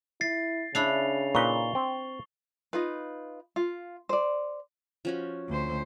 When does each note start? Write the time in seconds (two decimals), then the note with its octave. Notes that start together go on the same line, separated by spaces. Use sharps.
0.21 E4 A6 C7
0.75 C#3 D4 E4 B5 C7 F7
1.35 A#2 D#4 B4 C#6 G7
1.75 C4
2.73 D#4 F4 B4
3.56 F4
4.09 C5 D5
5.05 F3 C#4 F#4
5.49 D2 C5